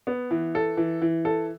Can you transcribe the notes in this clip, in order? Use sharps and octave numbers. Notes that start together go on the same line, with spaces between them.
B3
E3
A4
E3
E3
A4